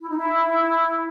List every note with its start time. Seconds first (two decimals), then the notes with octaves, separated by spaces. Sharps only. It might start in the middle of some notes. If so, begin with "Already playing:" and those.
0.01 E4
0.09 D#4
0.16 E4